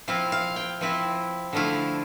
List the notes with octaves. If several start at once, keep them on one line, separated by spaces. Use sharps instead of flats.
F3 C4 E4 F5
F5
G5
F3 C4 E4
D3 F3 A3 E4 F5